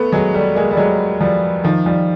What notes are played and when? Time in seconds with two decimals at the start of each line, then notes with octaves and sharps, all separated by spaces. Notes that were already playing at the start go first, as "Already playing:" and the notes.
Already playing: A3 B3
0.12 F#3 G#3
0.34 G3 A3
0.55 G#3 A#3
0.71 G3
0.77 F#3 G#3
1.20 F3 G3
1.64 D#3 F3
1.86 F3 G3